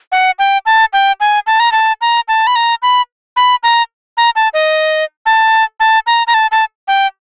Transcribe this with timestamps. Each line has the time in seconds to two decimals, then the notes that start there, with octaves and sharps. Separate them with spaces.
0.12 F#5
0.39 G5
0.66 A5
0.93 G5
1.20 G#5
1.47 A5
1.60 A#5
1.72 A5
2.01 A#5
2.28 A5
2.47 B5
2.56 A#5
2.82 B5
3.36 B5
3.63 A#5
4.17 A#5
4.36 A5
4.54 D#5
5.26 A5
5.80 A5
6.07 A#5
6.27 A#5
6.34 A5
6.52 A5
6.88 G5